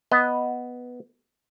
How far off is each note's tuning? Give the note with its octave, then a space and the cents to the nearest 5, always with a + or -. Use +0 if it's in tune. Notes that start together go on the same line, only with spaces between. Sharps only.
B3 +0 D#5 +0